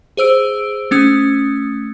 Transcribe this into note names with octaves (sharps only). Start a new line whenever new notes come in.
G#4 C5 E6 D7
A3 C#4 D#6